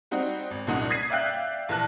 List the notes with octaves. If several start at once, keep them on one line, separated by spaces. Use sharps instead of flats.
G3 C4 D#4 F#4
G#1
C2 F#2 A#2 D#4 F#5
D#6 G#6 B6 C7 D#7
D5 E5 F5 G5 F#6
A#1 E3 A5 F#6